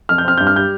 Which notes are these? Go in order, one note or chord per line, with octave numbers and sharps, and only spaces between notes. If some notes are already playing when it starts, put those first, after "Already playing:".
F2 F6
G6
C4 F6
G2 G6
F6
G3 G6